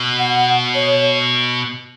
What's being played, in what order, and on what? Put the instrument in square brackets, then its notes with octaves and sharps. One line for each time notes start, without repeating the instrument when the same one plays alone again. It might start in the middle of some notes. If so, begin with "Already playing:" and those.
Already playing: [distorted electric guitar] B2
[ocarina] F#5
C#5